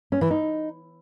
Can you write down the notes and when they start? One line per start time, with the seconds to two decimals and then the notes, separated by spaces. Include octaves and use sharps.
0.12 C#4
0.21 E3
0.31 D#4